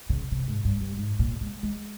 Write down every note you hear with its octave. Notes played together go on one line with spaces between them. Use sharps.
C#3
C3
G#2
G2
G2
G#2
A#2
G#3
G#3